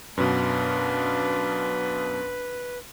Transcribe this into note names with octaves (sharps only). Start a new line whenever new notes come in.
F#2 B2 D4 B4 F5